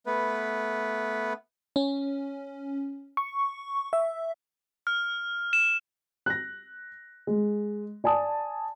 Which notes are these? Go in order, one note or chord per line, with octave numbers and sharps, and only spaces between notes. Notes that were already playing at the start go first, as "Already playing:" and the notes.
A3 B3 B4
C#4
C#6
E5
F6
E7
F#6 A#6
G#3
D5 G#5 A5 D#6